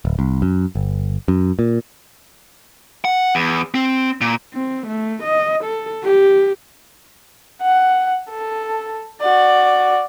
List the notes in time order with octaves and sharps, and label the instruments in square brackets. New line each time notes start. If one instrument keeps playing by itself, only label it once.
[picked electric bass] D1
C2
F#2
G1
F#2
A#2
[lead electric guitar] F#5
E2
C4
A#2
[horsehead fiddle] C4
A3
D#5
A4
G4
[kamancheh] F#5
A4
F#4 D5